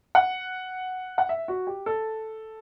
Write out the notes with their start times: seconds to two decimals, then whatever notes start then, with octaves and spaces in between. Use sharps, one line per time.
0.15 F#5
1.18 F#5
1.29 E5
1.48 F#4
1.67 G4
1.86 A4